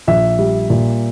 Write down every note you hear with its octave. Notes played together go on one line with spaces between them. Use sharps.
A#1 E5
G3
A#2